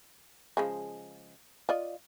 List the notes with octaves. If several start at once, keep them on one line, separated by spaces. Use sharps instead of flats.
C#3 F3 G#3
F4 D5 D#5